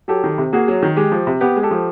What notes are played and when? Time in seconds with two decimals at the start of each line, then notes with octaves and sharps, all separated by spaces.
0.08 F#3 G4 A4
0.24 D#3
0.38 C3
0.53 A#3 F#4 G#4
0.68 F#3
0.83 D#3
0.96 G#3 G4
1.12 F3
1.27 C3
1.41 B3 G4
1.56 G#3
1.63 G4 A4
1.71 F3